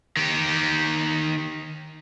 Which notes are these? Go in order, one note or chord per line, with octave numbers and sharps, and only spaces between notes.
D#3 G4